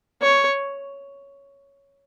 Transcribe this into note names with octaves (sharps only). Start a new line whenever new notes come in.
C#5